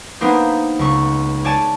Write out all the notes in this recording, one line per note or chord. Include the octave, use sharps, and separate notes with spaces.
A#3 B3 D4 D#4 C5
C#2 C#6
C#5 D5 G#5 A5